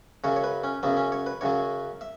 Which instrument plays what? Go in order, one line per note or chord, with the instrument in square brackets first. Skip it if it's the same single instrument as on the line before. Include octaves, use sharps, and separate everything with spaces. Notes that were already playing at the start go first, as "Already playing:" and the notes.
[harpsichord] F#2 C#3 F#3 C#5
C#5
B4
C#4
F#2 C#3 F#3 B3
C#4
C#5
B4
F#2 C#3 F#3 C#5
E5